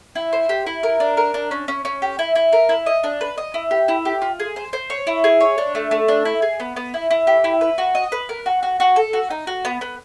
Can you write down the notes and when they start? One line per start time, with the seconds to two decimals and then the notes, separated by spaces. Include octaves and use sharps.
0.15 E4
0.33 C5
0.49 G4
0.66 E4
0.83 A#4
1.00 D4
1.17 A#4
1.34 D4
1.51 C#4
1.68 C#4
1.85 C#4
2.02 G4
2.19 E4
2.35 E4
2.52 A#4
2.69 E4
2.86 D#5
3.04 D4
3.21 B4
3.38 D#5
3.54 E4
3.71 G4
3.88 E4
4.05 G4
4.22 F4
4.40 G#4
4.56 C5
4.73 C5
4.90 C#5
5.07 E4
5.24 G#4
5.41 C#5
5.58 D4
5.75 A3
5.91 A3
6.08 D4
6.25 E4
6.42 G#4
6.60 B3
6.76 B3
6.94 E4
7.11 E4
7.27 G4
7.44 E4
7.61 B4
7.78 F#4
7.95 D#5
8.12 B4
8.29 A#4
8.46 F#4
8.63 F#4
8.80 F#4
8.96 A4
9.13 F#4
9.30 D#4
9.47 F#4
9.65 B3
9.81 B3